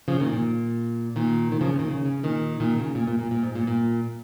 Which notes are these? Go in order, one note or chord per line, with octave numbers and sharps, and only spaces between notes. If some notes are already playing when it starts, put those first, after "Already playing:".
C#3 F3
A#2 D#3
A#2
A#2 D#3
A#2 D#3
C#3 F3
A#2 D#3
C#3
C#3
A#2 D#3
A#2 D#3
C#3
A#2
A#2
A#2
A#2
G#2
A#2
A#2